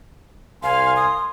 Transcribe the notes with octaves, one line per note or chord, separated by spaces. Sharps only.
C2 F5 G#5 C6
D#6